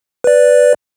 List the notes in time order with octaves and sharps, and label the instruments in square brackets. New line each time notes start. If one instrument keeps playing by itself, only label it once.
[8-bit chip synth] B4 D5